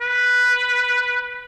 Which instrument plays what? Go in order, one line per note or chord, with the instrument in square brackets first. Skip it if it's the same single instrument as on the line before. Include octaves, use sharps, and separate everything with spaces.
[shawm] B4